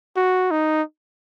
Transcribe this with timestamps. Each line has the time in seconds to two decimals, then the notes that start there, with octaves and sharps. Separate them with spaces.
0.17 F#4
0.51 D#4